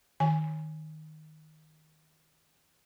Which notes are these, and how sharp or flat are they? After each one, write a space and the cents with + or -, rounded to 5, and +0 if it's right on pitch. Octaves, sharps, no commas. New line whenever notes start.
D#3 +0 G#5 +0